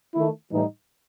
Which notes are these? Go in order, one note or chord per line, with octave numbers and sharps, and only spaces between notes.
D#3 A3 E4
A2 E3 G3 D#4